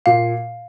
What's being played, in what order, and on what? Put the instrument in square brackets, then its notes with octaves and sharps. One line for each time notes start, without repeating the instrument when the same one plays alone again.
[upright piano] A#2 [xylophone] F5